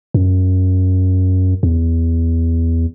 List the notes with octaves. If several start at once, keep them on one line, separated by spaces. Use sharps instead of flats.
F#2
E2